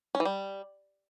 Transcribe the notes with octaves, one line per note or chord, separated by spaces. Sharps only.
C#4
E3
G3